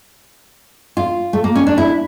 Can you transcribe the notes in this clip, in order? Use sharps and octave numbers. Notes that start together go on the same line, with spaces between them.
F4
A3
A#3
C#4
D4
E4